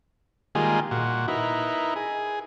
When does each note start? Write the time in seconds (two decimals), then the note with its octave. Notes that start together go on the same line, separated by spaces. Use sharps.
0.55 D#3 G3 G#3 A#3 F4 G#4
0.91 A#2 F#4
1.28 D#4 E4 A#4 B4
1.96 G#4